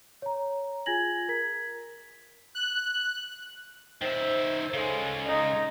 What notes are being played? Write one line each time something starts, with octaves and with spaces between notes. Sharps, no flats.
C#5 A#5
F4 G#4 G#5 G#6 A#6 F#7
A#4 A#5 G#6 B6
F#6
D#3 C5 E5
C#3 G#3 A4
D#4